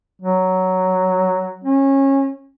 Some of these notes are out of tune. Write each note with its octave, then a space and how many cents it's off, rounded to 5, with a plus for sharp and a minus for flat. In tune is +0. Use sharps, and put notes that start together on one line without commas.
F#3 +5
C#4 -25